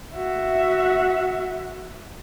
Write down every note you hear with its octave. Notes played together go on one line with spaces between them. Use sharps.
F#4 E5